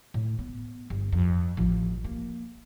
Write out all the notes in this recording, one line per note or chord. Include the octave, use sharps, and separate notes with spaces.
A2
B3
G1
F2
A1 F3
A#3